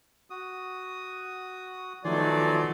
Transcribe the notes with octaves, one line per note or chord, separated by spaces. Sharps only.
F#4 D#6
B2 D#3 F3 F#3 A3 D5 G#5 C6